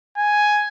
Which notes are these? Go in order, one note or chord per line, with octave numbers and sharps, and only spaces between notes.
G#5